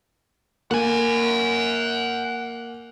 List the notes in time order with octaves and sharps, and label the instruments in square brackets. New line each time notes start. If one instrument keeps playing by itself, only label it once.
[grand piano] A#3 [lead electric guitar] F#5 G#5